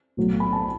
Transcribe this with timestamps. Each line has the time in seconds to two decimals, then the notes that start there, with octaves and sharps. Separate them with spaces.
0.17 B1 A2 F#3 A3
0.40 B5
0.53 A5